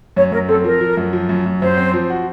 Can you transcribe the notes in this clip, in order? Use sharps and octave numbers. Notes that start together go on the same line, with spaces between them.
F#2 C#5
F#2 A#4
C4 A4
F3 A#4
F3
F#2
F3
F#2
F#2
F#2 C5
C4
F3
F#4